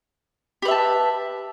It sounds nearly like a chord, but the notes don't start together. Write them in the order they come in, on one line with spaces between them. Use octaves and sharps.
G4 B4 E5 A5